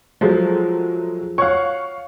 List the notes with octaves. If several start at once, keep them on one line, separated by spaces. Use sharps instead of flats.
F3 F#3 G#3 A3
C#5 F5 F#5 C#6